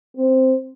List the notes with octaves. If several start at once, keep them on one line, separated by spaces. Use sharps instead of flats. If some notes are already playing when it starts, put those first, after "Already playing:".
C4